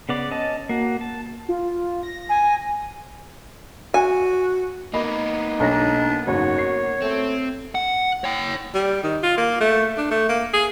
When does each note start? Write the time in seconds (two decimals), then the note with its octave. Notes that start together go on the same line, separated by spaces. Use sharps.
0.09 C#3 B3 D5
0.31 C#4 D#5 A5
0.69 A#3 F#4
1.01 A5
1.49 F4
2.03 A#6
2.29 G#5
3.94 F#4 G#5
4.94 A#3 B3 D#4 A#4 D#5 B5
5.60 B1 D4 C#5 A#6
6.27 F#1 G#2 F#4 C#5
6.58 C7
7.02 A3 C4
7.75 F#5
8.24 C#5 G5
8.74 G3
9.03 D#3
9.23 F4
9.38 A#3
9.60 A3
9.98 D4
10.11 A3
10.29 A#3
10.54 G#4